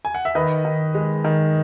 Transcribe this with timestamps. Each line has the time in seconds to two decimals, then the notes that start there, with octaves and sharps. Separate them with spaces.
0.05 G#5
0.14 F#5
0.25 E5
0.35 D#3 B4 D#5
0.65 D#3
0.95 G#3
1.24 D#3